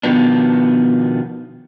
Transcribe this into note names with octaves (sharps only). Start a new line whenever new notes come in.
B2 D#3 F3 B3 D4